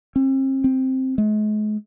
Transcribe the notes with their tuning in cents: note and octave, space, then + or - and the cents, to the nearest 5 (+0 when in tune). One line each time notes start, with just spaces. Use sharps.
C4 +40
C4 +0
G#3 +40